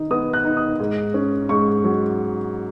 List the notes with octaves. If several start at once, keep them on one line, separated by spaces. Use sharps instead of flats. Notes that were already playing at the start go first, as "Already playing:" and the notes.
Already playing: D#3 D#4
B3 D#6
F#6
D#4
D#6
G#2
C#4
G#2 C#6
F#3